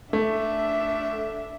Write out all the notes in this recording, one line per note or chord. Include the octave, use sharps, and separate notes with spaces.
A3 D4 E5